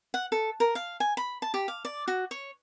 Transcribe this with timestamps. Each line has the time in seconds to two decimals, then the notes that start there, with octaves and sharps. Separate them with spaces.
0.14 F#5
0.32 A4
0.60 A#4
0.75 F5
1.00 G#5
1.17 B5
1.42 A5
1.54 G4
1.68 F5
1.85 D5
2.08 F#4
2.31 C#5